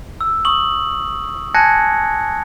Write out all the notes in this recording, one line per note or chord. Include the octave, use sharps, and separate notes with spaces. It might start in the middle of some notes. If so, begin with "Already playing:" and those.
E6
C#6 D#6 F#7
G#5 A5 F#6 G#6 A#6 C#7